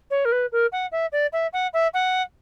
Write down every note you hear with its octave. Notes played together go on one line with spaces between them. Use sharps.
C#5
A#4
B4
A#4
F#5
E5
D5
E5
F#5
E5
F#5